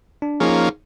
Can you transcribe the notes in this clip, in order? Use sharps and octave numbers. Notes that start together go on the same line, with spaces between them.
D4
F3 A#3 C#4 D#4 G#4